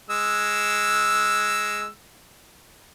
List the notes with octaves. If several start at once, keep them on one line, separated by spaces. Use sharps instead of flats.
G#3 E6